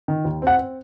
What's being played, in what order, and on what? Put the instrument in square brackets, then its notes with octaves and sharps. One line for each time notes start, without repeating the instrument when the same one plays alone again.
[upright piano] D#3
D#2
[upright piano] C4 [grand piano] F#5
[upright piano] C4